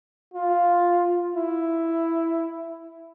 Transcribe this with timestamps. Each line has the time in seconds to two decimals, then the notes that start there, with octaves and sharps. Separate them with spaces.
0.34 F4
1.36 E4